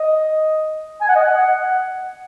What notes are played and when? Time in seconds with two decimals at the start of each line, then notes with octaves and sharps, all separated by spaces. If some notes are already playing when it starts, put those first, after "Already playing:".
Already playing: D#5
1.01 G#5
1.09 F#5
1.16 D#5
1.23 F#5